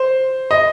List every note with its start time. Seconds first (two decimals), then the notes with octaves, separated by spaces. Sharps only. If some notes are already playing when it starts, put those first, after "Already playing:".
Already playing: C5
0.51 D#5